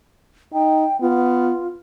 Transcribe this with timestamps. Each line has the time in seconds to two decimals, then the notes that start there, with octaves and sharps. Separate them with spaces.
0.54 D#4 G5
1.01 B3 F4